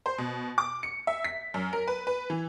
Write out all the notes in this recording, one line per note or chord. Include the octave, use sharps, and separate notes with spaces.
C5
B2
D6
C#7
E5
B6
F#2
A#4
B4
B4
E3